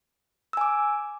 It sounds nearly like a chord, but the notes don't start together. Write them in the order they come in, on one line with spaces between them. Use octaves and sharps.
E6 G#5 D6